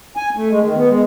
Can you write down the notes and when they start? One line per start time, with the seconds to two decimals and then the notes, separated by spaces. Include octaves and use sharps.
0.17 G#5
0.36 A3
0.50 G#3
0.63 D#3
0.77 B3
0.89 G#3